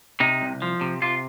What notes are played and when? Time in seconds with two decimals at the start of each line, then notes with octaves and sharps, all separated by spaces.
0.20 C3 D#4
0.41 C2
0.62 F3
0.81 C3
1.02 C3 F4